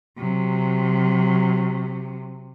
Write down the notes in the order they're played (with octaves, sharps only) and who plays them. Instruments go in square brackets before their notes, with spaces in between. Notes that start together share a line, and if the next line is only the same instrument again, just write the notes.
[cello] C3 F#3